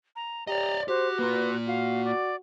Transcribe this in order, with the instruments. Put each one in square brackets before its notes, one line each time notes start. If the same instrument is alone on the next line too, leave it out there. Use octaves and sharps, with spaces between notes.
[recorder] A#5
[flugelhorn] G4 [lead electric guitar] D5 D#5 [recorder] A#5
[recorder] F#4 [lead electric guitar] G4 [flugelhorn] C5
[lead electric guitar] A#3 F4 [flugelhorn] B4
[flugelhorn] F#4 [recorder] F5
[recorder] D5